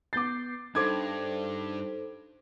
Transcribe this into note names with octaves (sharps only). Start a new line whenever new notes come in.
B3 D6 G6 A6 C7
G2 D#4 A4 C5 D6 G#6